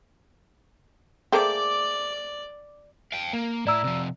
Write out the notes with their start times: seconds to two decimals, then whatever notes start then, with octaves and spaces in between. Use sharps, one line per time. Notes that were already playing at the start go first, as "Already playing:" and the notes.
1.32 A3 A#3 G#4 C5 D5 E5 G5 D6
3.12 F5 G5
3.33 A#3
3.67 A2 E4 D5 A#5 E6
3.84 C3 F3